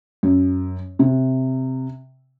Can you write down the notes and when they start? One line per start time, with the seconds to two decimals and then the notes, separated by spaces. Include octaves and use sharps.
0.23 F#2
0.99 C3